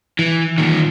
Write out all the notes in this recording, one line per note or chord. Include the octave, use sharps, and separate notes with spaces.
E3
A#2 D#3